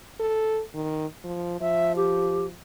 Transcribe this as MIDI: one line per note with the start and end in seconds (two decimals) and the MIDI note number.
0.20 0.61 69
0.74 1.06 51
1.24 1.60 53
1.61 2.57 53
1.61 1.93 76
1.96 2.46 67